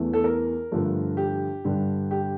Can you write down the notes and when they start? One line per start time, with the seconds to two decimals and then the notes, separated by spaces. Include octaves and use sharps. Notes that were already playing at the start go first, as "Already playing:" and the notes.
Already playing: E2 E3 A3
0.13 A4
0.24 A#4
0.72 G2 D3 F3 A3
1.17 G4
1.64 G2 D3 G3
2.11 G4